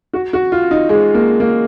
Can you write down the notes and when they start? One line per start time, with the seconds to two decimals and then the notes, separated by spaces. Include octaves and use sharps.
0.13 F#4
0.33 F#4
0.52 F4
0.71 D#4
0.89 G#3
1.14 A#3
1.40 A#3